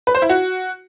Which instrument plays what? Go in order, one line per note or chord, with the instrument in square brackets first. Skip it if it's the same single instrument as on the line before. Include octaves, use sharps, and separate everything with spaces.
[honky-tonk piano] B4
C5
E4
F#4